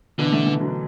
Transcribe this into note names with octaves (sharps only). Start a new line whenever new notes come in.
B2 D3 E3
E3 A3
E3 A3
D3 F#3
D4